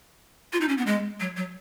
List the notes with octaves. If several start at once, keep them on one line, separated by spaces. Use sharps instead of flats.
F4
D#4
C#4
B3
G#3
F#3
F#3